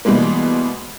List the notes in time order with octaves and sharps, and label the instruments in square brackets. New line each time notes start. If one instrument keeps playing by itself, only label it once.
[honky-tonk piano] B2 E3 G3 G#3 A#3